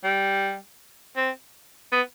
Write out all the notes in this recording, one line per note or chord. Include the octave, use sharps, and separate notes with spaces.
G3
C4
B3